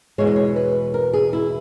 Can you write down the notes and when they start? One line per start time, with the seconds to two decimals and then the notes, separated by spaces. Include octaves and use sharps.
0.18 E2 B2 G#3 C#5
0.27 D#5
0.36 C#5
0.56 B4
0.94 A#4
1.13 G#4
1.33 E4